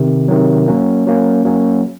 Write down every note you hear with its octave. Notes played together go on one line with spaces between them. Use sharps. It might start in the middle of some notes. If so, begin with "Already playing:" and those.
Already playing: C3 D#3
C3 D#3 F#3
F#3 A#3 C#4
F#3 A#3 C#4
F#3 A#3 C#4